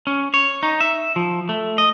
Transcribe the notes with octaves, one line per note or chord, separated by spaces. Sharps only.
C#4
C#5
D#4
E5
F3
A3
D#5